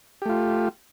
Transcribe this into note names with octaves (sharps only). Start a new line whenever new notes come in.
A3 F4 G4